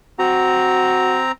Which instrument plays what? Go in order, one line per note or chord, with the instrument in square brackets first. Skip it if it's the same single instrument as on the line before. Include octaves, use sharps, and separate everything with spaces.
[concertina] C4 A#5 [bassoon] F#4